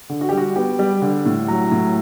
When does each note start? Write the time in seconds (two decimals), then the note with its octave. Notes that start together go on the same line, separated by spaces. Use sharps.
0.09 D3
0.21 F#4
0.29 G4
0.32 G3
0.37 F#4
0.56 B3 G4
0.79 G3
1.02 D3
1.26 A2
1.48 F#3
1.71 A2